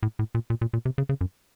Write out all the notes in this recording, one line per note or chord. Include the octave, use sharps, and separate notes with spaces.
A2
A2
A#2
A#2
A#2
A#2
C3
C#3
C#3
F#2